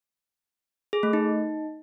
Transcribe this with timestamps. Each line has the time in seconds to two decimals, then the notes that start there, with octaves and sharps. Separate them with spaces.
0.93 G#4
1.03 A3
1.13 D#4